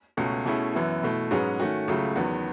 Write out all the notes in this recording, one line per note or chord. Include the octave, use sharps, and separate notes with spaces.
C#2 B2 A3 C#4
B2 A3 C#4 E4 G#4
F#2 E3 B3 E4
B2 A3 E4
G#2 F#3 C#4 G#4 B4
D#3 A3 C#4 F#4
C#2 C#3 F#3 A3
E2 D#3 F#3 B3